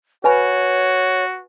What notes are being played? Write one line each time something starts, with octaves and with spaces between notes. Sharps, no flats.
F#4 B4 C#5 G#5 B5